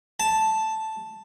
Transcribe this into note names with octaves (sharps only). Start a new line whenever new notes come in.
A5